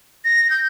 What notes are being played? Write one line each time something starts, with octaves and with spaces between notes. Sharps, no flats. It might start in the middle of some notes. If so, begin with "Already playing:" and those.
A#6
G6